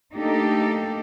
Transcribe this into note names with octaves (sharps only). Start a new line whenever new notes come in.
A3 A#3 D4 D#4 G4 A4